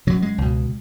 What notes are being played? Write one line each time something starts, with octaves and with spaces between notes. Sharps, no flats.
F#2 C#3 F#3
G#3
C#2 B2